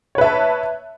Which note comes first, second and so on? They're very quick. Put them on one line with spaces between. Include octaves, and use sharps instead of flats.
C#5 B4 E5 A5